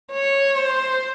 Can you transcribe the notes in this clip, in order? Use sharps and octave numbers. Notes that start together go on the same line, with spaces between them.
C#5
C5